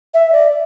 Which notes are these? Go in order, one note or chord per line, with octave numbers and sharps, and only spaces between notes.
E5
D5